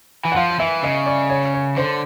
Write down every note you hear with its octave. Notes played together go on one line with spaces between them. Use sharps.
E3
F#5
F3 F5
E3 E5
C#3 D#5
D5
C#5
C#5
D3 C5